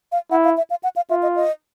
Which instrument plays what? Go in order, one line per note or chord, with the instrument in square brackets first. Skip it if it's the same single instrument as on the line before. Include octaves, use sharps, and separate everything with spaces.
[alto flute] F5
[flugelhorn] E4 [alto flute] F#5
[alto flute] F5
E5
F5
F#5
F5
[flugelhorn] F4 [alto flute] E5
[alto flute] D#5
D#5